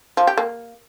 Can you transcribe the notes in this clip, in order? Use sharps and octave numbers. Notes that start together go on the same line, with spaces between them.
F3
G4
A#3